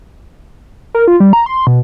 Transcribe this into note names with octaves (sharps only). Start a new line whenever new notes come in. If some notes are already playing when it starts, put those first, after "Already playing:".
A#4
F4
G3
A#5
C6
B2